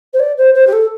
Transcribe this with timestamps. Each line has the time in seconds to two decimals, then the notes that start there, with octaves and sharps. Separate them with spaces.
0.13 C5
0.19 D5
0.37 C5
0.54 C5
0.67 G4
0.72 A4